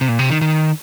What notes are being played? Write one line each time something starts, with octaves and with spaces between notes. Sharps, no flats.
C3
A#2
C3
D#3
D#3